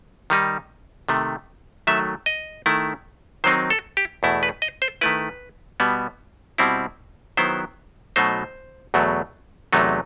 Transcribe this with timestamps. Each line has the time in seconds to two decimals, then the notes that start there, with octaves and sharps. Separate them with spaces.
0.30 D#3 G3 D#4
1.09 C3 D#3 A3
1.87 D#3 F#3 A3 E5
2.26 D#5
2.66 D#3 A3 E4
3.44 D#3 F#3 C4 D#4 C5
3.70 A4
3.97 G4
4.23 E2 B2 A3 E4
4.43 B4
4.62 D#5
4.82 C5
5.01 D#3 A3 E4 B4
5.80 B2 G3 B3
6.58 B2 G3 C4 E4
7.37 D#3 F#3 B3 E4 C5
8.16 B2 F#3 A3 D#4 C5
8.94 E2 B2 F#3 A3
9.73 E2 C3 F#3 A3 D#4